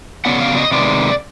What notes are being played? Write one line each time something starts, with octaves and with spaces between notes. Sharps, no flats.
C#3 F#3 B3 D4 F#5
F5
D#5
C3 D#3 G#3 B3 D5